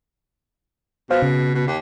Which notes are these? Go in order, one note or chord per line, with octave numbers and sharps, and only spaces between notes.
B2 C5 F5
C#3
B2
D#2